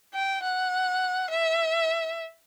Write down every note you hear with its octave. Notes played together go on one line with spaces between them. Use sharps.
G5
F#5
E5